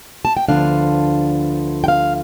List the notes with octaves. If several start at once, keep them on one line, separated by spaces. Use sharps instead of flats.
A5
G5
D2 D3 F3 B3 D4 F5
G5
F5